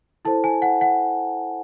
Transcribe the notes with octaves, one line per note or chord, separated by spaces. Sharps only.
E4 A4 C5 A5
G#5
F#5
F#5